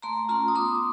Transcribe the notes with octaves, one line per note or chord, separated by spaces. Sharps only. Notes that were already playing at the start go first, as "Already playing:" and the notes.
A3 A#5 C6
C#4 F4 A#5 C6
D#6
B3 C6 D6